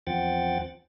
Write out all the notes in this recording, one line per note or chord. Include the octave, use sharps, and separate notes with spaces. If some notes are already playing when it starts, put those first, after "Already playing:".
E2 F3 C4 F#5 G5 A6